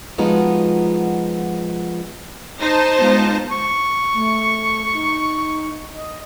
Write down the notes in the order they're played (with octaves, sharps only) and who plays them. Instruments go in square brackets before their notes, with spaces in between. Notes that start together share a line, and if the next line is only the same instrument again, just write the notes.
[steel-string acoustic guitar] F3 G#3 B3 D#4 F4 F#4
[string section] D#4 C5 A5
[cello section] G#3 B3 F4
[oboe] C#6
[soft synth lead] A3
D#4
D#5